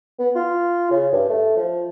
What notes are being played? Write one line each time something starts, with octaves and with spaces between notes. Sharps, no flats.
B3
F4
C#3
G2
A3
F3